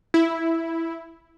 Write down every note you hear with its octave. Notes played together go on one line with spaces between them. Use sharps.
E4